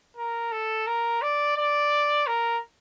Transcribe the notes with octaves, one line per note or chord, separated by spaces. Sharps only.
A#4
A4
A#4
D5
D5
A#4